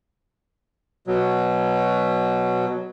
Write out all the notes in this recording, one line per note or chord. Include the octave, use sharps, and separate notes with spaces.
B2 F#3